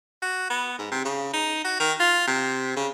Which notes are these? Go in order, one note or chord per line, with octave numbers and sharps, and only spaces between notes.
F#4
B3
G#2
C3
C#3
D#4
F#4
D#3
F4
C3
C#3